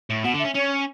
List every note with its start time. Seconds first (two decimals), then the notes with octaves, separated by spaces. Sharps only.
0.10 A2
0.24 B2 F#5
0.34 D3
0.39 E5
0.44 C#4
0.54 C#4 C#5